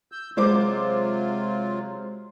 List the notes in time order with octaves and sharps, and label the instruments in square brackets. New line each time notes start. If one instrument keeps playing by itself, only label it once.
[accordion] E6 G6
[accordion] C3 F#3 F4 [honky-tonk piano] G#3 C5 D6